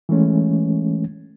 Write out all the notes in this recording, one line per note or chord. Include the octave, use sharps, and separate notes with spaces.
E3 G#3 A3 C#4